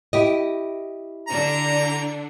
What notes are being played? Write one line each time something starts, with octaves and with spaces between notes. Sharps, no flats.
E4 G4 D#5
D3 D4 A#5